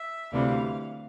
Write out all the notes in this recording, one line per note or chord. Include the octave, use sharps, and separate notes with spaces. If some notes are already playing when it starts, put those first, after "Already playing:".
Already playing: E5
D2 C3 E3 G3 F5